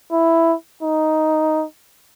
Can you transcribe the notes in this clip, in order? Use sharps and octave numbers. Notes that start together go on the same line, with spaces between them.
E4
D#4